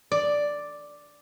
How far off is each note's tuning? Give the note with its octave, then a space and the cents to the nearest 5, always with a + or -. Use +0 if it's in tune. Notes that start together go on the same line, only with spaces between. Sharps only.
D5 +0